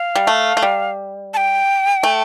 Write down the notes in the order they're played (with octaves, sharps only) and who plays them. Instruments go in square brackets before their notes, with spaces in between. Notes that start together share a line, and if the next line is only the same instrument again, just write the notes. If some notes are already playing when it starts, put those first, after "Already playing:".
Already playing: [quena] F5
[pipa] G3
A3
A3
G3
[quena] A5
G5
[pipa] A3